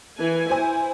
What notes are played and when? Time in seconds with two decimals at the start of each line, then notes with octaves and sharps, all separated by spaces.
0.18 E3 G#5
0.50 E4 C5 G#5